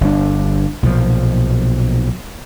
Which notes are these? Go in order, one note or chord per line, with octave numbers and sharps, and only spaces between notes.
G1 D4
B1 A#2 F3